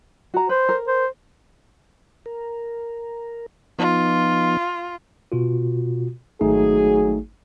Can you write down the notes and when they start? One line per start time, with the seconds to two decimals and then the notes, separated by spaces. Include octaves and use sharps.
0.34 F#4 A#5
0.49 B4 C5
0.69 A#4
0.87 C5
2.26 A#4
3.79 F3 B3 D#4 F4
5.32 B2 F4 F#4
6.41 G#1 F#3 A3 D#4 G#4